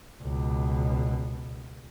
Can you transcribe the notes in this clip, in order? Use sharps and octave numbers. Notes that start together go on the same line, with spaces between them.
C#2 B2